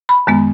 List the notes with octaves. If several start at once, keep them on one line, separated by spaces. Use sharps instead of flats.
B5
F#2 D#3 G#3 B3